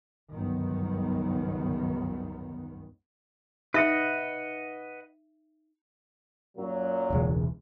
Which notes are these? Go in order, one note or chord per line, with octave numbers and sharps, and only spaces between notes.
G1 C#2 F#2 D#3 B3
D#4 B4 D#5 E5 F#5
F#2 A#2 F#3
E1 C#2 G#3